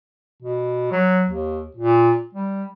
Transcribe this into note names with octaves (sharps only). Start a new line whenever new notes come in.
B2
F#3
D#2
A#2
G3